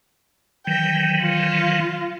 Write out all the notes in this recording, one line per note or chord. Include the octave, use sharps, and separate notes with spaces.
D#3 E3 F#3 G5
F4